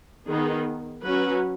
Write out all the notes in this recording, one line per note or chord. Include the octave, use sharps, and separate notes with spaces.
D#3 B3 D#4 G#4
F#3 C#4 F#4 B4